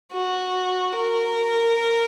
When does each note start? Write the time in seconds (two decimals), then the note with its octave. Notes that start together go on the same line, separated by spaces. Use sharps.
0.12 F#4
0.93 A#4